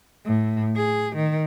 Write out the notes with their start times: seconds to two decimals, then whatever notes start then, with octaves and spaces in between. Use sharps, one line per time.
0.24 A2
0.76 G#4
1.15 D#3